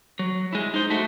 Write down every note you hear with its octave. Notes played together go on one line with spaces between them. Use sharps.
F#3
G#3 E4
D#4 C5
A3 F#4